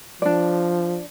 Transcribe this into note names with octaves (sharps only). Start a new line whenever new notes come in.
F3 D4 D5